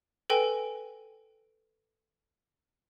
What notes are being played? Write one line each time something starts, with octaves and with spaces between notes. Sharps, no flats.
A4 B4 G5 G#5